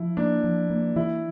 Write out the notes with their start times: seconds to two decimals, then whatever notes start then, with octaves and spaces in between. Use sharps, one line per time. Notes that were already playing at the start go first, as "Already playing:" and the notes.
Already playing: F3 E4
0.17 A#3 D4
0.44 F3
0.70 A#3
0.96 E3 E4